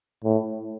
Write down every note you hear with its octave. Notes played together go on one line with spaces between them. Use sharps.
A2